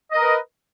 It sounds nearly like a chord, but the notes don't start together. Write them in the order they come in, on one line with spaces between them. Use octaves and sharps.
D#5 A#4 B4